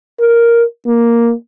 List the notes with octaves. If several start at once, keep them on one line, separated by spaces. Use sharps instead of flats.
A#4
A#3